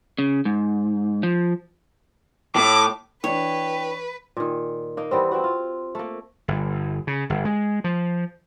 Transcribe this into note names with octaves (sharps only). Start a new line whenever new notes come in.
C#3
G#2
F3
A2 D6
E3 D4 B4 C#5 G5
A#2 D#3
A#3 D#4
E3 G3 B3 C4
C4 E4 F#4
F4
A3 A#3
G1
C#3
G1
G#3
F3